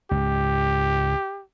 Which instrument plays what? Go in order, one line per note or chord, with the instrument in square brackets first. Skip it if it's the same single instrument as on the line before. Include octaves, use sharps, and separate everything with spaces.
[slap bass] C#2 G#2 [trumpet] G4